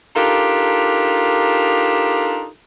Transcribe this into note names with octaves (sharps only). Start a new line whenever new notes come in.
D4 D#4 F4 G4 A4 A#4